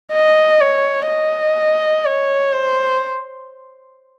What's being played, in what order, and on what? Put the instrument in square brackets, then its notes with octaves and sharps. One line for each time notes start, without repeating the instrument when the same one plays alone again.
[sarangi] D#5
C#5
D#5
C#5
C5